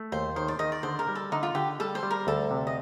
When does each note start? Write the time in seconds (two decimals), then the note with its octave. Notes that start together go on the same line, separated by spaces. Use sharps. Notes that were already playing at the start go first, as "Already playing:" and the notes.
Already playing: A3
0.12 D#2 C5
0.36 D#3 C5
0.48 D5
0.59 D#3 D#5
0.72 D5
0.83 D3 C5
0.99 A#4
1.08 G3
1.15 A4
1.32 D3 D#4
1.43 F4
1.55 D3 G4
1.80 G3 A4
1.95 C5
2.03 G3
2.11 A#4
2.27 D2 A4
2.51 C3
2.67 D#5